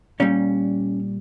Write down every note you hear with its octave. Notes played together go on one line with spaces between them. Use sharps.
A#2 G3 C#4